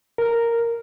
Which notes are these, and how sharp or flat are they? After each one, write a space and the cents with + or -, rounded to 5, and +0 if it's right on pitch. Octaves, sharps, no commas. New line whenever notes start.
A#4 -5